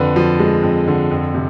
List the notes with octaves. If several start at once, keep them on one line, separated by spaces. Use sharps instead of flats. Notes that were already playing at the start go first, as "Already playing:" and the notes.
Already playing: F2 D3 B4
F3
G#3
F2
D3
F2
C3